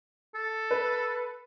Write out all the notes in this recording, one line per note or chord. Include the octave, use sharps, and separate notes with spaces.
A4
B4